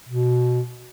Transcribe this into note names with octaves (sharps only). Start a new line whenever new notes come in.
B2